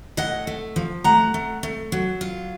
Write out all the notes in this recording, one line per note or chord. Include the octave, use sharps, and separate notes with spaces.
A2 D#5 F#5
A3
F3
A3 F#5 A#5
A3
A3
F#3
F4